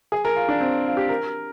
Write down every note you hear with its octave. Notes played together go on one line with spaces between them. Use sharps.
G#4
A#4
F4
D4
C4
F4
G4
A#4